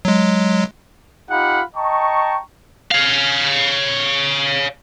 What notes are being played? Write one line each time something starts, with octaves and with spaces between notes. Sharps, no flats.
F#3 G#3
D#4 F4 G4 F5 F#5 B5
D#5 G5 A5 A#5 C#6
C#5 F5